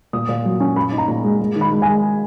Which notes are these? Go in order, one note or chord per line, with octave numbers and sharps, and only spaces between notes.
A#2 D#6
A#2
F#3
C#4
A#2 B5
D#4
A#5
A#2
G#3
G#3
D#3
B5
G#3
G#5
G#3